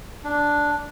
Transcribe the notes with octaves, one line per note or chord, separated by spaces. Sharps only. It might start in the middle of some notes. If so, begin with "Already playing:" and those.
D4